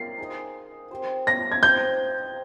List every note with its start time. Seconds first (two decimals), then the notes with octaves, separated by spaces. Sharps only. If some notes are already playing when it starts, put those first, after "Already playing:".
Already playing: C4 F4 A#4 F5 C7
0.19 D#4 G#4 D#5
0.91 C4 G4 C5
1.27 A#6
1.52 G#6
1.62 C4 D#4 G4 C5 G6